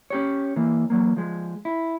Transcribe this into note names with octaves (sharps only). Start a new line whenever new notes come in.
C#4 G4 C#5
E3 A#3
E2 F#3 A#3
F3 G#3
E4